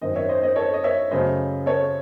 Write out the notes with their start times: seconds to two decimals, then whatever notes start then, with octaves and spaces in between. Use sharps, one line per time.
0.01 G#1 F#2 D#3 C5 D#5
0.16 C#5 E5
0.29 C5 D#5
0.43 C5 D#5
0.56 A4 C#5
0.74 D#5
0.84 C#5 E5
1.11 F#2 C#3 F#3 A3 C5 D#5
1.66 A4 C#5